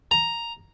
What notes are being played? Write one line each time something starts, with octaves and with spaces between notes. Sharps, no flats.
A#5